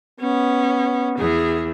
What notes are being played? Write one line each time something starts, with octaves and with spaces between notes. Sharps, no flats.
B3 C#4
E2 G#4